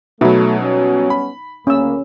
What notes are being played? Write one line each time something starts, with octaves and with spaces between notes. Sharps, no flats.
B2 F#3 A3 D#4 E5 B5
G3 B3 C#4
B5
D2 A#3 C#4 E6